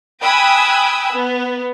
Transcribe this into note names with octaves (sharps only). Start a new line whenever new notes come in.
G5 G#5 B5 D#6 E6 F#6
B3